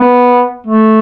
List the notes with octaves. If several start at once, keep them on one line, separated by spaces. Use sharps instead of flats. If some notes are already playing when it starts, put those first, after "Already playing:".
Already playing: B3
A3